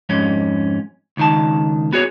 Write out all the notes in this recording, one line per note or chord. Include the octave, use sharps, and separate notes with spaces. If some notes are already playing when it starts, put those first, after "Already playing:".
F2 G#2 C#4
C#2 D#3 A5
B3 F#4 G#4 C#5